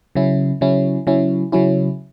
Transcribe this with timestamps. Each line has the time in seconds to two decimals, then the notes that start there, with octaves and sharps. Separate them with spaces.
0.15 C#3 F#3 C#4 E4
0.61 C#3 F#3 C#4 E4
1.07 C#3 F#3 C#4 E4
1.52 C#3 F#3 C#4 E4